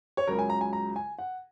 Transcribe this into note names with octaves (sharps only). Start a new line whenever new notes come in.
C#5
C#2 C#3 F#3 A#4
G#5
A#5
G#5
A#5
G#5
F#5